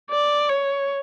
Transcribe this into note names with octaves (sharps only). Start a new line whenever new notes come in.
D5
C#5